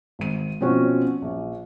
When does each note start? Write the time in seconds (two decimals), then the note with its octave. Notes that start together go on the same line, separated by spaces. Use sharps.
0.19 G#1 D#7
0.60 B2 F3 C4 C#4 F#4
1.22 A#1